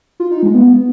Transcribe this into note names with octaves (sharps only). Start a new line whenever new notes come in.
F4
D#4
G#3
B3